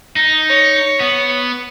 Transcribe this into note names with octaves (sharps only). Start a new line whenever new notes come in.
D#4
C#5
B3